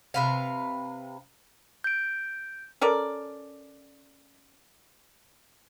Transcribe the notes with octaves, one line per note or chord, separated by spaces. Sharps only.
C3 B4 F5
G6 D7
C#4 A4 A#4 D5